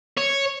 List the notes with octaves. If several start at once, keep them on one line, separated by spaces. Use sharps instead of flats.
C#5